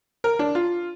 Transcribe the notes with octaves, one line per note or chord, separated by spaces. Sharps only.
A#4
D4
F4